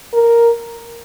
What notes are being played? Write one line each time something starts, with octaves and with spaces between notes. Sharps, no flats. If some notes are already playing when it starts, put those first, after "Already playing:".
A#4